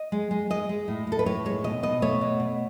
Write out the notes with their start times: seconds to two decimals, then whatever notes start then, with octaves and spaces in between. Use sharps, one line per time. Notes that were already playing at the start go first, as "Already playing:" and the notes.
Already playing: D#5
0.12 G#3
0.31 G#3
0.50 G#3 D#5
0.69 G#3
0.88 A2
1.07 A2 A4
1.19 B4
1.26 A2 C#5
1.45 G#3 C#5
1.64 B2 D#5
1.83 B2 D#5
2.02 A3 C#5
2.21 B2
2.40 B2